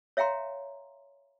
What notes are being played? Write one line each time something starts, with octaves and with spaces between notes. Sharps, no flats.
C#5 E5 F5 G5 A#5 C6